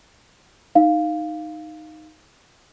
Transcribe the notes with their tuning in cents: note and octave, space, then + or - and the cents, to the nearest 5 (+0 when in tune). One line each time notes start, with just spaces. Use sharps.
D#4 +0 F5 +0